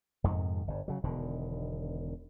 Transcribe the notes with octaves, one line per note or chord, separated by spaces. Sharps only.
F2 G#2 C3 D#3
G1 G2
C#3 F#3
E1 B2 D3 D#3